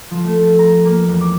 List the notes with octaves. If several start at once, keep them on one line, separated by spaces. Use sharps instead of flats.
F3
A3
A6
A#5
A#3
E1
D6